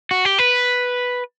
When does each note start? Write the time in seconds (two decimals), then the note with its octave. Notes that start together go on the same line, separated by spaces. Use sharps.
0.11 F#4
0.25 G4
0.39 B4